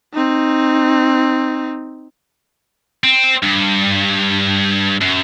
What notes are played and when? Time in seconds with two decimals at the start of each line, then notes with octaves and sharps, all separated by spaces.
0.13 C4 D#4
3.04 C4
3.43 G2
5.01 F#2